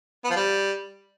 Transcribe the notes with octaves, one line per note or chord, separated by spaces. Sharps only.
B3
F3
G3